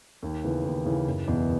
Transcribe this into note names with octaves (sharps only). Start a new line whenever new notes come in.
D#2
C#3 E3 B3
D#2
C#3 E3 B3
F#1
E2 B2